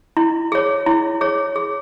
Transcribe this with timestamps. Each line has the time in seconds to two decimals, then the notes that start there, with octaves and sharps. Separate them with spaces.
0.17 E4
0.52 G#4 C#5
0.86 E4
1.21 G#4 C#5
1.56 G#4